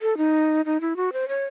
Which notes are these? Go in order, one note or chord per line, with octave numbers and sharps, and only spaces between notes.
A4
D#4
D#4
E4
F#4
C5
C#5